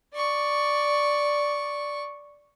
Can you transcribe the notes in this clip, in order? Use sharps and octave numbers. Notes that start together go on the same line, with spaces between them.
D5 C#6